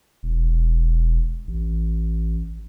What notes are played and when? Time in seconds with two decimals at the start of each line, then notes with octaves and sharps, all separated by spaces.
0.23 E1
1.47 A1